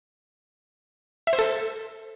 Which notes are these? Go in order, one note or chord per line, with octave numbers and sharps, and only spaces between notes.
E5
C5
A4